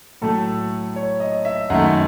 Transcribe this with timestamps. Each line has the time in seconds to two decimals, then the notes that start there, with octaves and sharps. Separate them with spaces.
0.22 A2 F#3 A3 A4
0.96 C#5
1.20 D#5
1.45 E5
1.70 F#2 D#3 A3 F#5